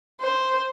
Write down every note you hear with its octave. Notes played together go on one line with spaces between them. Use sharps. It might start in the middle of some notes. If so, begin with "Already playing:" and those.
C5